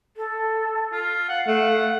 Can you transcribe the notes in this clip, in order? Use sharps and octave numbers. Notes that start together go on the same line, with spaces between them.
A4
F4
F5 F#5
A3 F#5